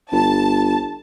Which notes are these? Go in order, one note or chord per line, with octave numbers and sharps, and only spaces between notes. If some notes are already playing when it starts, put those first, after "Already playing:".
G1 A5